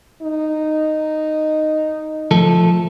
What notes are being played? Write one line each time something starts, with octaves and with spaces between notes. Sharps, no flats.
D#4
F3 A3 A4